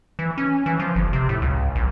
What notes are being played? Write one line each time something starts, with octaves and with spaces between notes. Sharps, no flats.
E3
C#4
E3
F3
G1
C3
A2
C#2
A#1